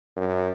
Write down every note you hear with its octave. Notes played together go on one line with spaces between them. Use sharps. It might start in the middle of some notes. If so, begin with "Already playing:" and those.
F#2